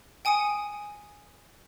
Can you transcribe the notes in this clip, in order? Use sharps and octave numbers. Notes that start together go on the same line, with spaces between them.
G5 G#5 D#6 C#7 D#7